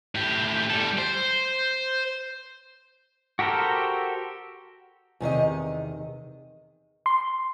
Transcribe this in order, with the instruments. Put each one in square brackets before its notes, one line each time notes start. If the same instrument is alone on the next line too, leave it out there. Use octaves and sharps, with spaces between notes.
[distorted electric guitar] A2 G4
G3 A4
C5
[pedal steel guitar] F#4 G4 A4 A#4 C5
[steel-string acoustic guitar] E2 C3 D#3 D#5
[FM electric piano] C6